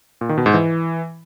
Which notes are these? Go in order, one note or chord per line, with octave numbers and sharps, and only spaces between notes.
A#2
D#3
B2
G#2
E3